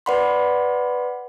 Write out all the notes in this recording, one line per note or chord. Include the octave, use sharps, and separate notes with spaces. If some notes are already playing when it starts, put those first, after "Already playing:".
B4 D5 F#5 B5 C6